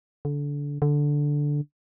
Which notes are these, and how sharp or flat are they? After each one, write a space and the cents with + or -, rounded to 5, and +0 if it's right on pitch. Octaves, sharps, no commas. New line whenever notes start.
D3 -25
D3 -5